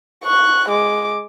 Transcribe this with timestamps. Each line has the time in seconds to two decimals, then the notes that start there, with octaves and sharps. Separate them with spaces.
0.24 C#6 F#6
0.69 G#3 D6